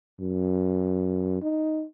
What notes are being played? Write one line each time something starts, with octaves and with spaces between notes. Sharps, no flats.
F#2
D#4